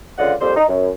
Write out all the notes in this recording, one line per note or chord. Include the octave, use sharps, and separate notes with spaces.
C#2 D3 F4 D5 D#5 F#5
F2 A#2 G3 C5
D#4
F#2